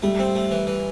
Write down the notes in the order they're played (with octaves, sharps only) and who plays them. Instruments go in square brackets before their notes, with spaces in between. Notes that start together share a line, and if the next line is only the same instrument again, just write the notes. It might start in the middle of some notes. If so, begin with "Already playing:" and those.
[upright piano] G3 [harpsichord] A3
[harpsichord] C4
A3
E3
E3